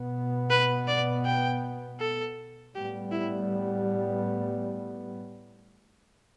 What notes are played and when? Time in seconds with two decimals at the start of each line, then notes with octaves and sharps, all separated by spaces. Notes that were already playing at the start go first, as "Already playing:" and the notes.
Already playing: B2 B3
0.51 B4
0.88 D5
1.25 G5
2.00 A4
2.74 A2 G3 B3 G4
3.12 E4